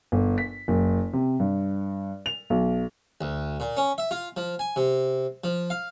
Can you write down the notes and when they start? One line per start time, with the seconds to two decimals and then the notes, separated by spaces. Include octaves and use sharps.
0.12 G1
0.38 B6
0.68 F#1
1.13 C3
1.40 G2
2.26 F7
2.50 B1
3.21 D2
3.60 A#2
3.77 C#4
3.98 E5
4.11 F4
4.37 F3
4.59 G#5
4.76 C3
5.44 F3
5.70 F5